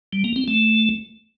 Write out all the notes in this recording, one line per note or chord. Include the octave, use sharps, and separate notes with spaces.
G3
A#3
C4
A3